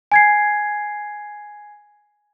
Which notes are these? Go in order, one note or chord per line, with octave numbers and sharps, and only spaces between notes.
G#5 G#6 C7